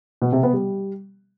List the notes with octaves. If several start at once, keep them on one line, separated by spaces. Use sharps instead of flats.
B2
C3
B3
G3